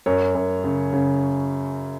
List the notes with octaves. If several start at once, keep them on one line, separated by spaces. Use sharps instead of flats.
F#2 C#5
F#2
C#3
C#3